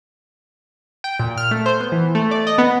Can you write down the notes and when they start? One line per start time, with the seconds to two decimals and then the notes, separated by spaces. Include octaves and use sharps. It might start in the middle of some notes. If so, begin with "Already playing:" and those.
1.04 G5
1.19 A#2
1.38 F6
1.51 A3
1.66 C5
1.80 B3
1.92 E3
2.15 A3
2.31 D5
2.47 D#5
2.58 B3